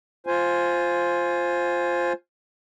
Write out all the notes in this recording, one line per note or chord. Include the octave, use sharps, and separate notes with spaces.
F4 C5 G#5